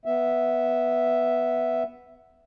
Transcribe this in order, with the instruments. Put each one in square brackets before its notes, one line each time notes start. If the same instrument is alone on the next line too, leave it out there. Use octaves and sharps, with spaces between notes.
[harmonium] B3 E5